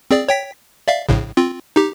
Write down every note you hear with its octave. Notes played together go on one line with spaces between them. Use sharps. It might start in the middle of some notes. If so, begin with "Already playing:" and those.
C4 G#4 D5
C#5 G5 B6
D5 E5 F5
A#1 A2 C#3
C4 F4
D#4 G4